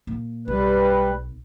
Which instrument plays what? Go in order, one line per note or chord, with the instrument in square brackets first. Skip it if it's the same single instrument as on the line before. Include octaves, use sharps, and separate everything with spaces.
[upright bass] A#2
[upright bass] B1 [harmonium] G3 B4